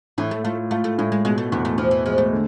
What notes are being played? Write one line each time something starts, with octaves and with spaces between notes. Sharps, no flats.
A2 E3
A3
A3 F4
A3 F4
A3
A2 G#3
G#3
B2 G#3
A3
E2 B3
A3
E2 F3
E3
F3 G#3
A3
D3